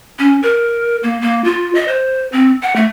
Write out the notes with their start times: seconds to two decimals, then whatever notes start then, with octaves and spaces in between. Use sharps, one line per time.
0.19 C#4
0.43 A#4
1.03 A#3
1.21 A#3
1.44 F4
1.75 D#5
1.88 C5
2.32 C4
2.62 F#5
2.76 A3